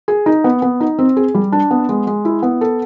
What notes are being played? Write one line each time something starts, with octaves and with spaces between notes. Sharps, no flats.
G#4
D#4
B3
B3
D#4
C4
G#4
G3
D4
B3
G#3
G#3
E4
B3
A4